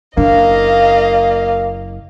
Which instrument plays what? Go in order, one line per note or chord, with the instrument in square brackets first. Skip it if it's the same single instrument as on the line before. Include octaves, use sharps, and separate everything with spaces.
[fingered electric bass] F#1 [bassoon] A#3 [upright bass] D4 [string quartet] D#5 F5